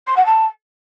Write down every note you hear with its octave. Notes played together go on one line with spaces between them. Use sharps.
C6
F#5
A5